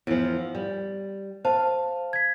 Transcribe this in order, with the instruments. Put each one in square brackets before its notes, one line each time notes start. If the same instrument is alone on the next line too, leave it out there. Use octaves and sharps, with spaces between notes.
[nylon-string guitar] E2 F3
G3
[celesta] C5 A5 [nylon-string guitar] F5
[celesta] G#6 B6